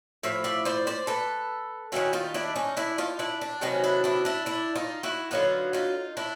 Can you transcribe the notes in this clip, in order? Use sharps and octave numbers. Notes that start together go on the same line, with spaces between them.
A2 F3 E5
D5 E5
C5 D5
C5 D5
A4 B4
D#3 G3 A#3 C#4 E4 F#4
D#4 F4
D4 E4
C#4 D#4
D4 E4
D#4 F4
D4 E4
D4
C3 D#3 F#3 B3 C#4 D#4
D4 E4
D4 E4
D4 E4
D4 E4
D#4 F4
E4 F#4
D3 F#3 B3 D#4 F4
D#4 F4
D4 E4